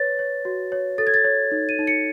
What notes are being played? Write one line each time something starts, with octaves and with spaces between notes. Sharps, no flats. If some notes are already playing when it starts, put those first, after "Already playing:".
Already playing: B4 C#5 A6
C#5
F#4
C#5
A4 A6
G#6
A6
C#5
D#4
D#7
D#4
C#7